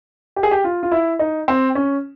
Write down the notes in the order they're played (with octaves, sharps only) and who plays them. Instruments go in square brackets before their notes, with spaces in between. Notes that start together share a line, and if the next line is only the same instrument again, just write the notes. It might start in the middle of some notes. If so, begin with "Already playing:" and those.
[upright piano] G4
G#4
G4
F4
F4
E4
D#4
C4
C#4